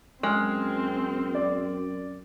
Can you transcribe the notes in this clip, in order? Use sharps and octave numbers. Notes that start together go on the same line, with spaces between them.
F#2 G#3 C4 G#5 F6
D5